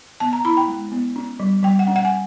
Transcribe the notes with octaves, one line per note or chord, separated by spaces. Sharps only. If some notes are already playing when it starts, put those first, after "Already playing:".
B3 A5
A#5
E4 B5
G5
G#3
B3
C#4
G3
G3 G5
F#5
C#4
F#5
G#5